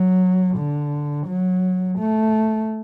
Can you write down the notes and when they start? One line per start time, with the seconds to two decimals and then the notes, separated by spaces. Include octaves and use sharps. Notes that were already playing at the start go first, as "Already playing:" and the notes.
Already playing: F#3
0.57 D3
1.28 F#3
1.99 A3